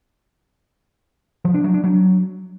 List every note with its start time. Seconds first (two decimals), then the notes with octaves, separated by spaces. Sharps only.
1.44 F3
1.54 D4
1.64 F#3
1.74 D4
1.84 F#3